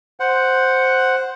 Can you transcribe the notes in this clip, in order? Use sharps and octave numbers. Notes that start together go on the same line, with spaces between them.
C5 F#5